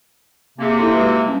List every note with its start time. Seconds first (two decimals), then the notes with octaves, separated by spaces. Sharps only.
0.59 C3 A#3 C4 G#4
0.79 D#4 E4 A4
0.93 G#3 F#4 B4
1.26 G3 C#4